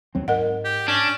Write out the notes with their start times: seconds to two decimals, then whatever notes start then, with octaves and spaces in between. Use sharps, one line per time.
0.15 D#2 F#3 C4
0.28 G#2 A#4 D#5 F#5
0.64 G4
0.88 C#4 D4